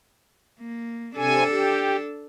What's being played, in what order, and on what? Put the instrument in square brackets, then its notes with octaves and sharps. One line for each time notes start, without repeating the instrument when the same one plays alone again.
[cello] A#3
[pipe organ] C3 G#5 [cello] D4 A4
[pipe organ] G4